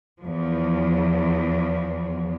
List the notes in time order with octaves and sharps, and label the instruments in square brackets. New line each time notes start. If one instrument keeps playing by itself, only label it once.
[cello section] E2 F3